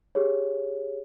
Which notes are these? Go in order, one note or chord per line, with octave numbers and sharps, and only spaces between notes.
G4 G#4 C#5